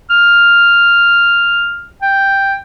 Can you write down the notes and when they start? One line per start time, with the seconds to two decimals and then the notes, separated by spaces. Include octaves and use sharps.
0.10 F6
2.02 G5